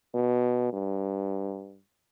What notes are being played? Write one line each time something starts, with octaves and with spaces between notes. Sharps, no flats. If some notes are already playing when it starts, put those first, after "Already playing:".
B2
G2